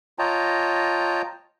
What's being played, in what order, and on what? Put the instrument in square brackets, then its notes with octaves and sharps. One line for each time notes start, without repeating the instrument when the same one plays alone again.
[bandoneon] F4 C#5 D#5 G5 A5 A#5